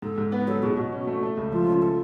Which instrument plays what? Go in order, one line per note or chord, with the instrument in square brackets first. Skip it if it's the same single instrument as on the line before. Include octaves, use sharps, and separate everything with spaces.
[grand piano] G#2 [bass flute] A4
[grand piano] G#2
[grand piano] B3 [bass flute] B4
[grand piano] F#3 [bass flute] A4
[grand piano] B2 [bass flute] G#4
[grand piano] B2 [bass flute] F#4
[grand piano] C#4
A3
A3
C#2
[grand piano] F3 [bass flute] F4
[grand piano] C#3
[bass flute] F4 [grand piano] A4